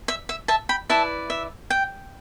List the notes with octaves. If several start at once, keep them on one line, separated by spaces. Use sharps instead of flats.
E5
E5
E5 A5
G5 B5
E4 B4 D5 E5 A5
E5
G5